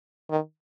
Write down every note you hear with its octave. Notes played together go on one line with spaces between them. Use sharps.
D#3